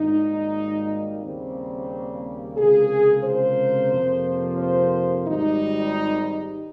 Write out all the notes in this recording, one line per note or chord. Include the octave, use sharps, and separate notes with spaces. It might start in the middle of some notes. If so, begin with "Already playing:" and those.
Already playing: G#1 G#2 G3 A#3 D#4
D#2 C#3 G3 A#3 C4
C#2 C3 F3 A#3 G#4
C5
F2 C3 F3 A#3
C5
G#1 G#2 G3 D#4